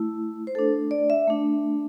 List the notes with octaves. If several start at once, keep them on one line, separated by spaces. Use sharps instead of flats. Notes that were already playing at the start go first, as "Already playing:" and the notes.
Already playing: A3 E4
C5
A3 D4 A4
D5
E5
A3 D4